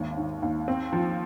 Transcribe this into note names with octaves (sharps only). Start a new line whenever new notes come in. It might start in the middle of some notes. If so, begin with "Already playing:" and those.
Already playing: G#1 D#2
D#3
D#2
C4
F3